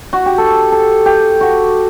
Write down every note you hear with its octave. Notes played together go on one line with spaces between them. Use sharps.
F#4
G4
A4
A4
G4
F#4